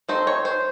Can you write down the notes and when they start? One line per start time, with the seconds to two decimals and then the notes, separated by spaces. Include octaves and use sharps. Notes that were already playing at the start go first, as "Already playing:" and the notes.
0.09 A3 C4 D#4 C5
0.27 C#5
0.45 C5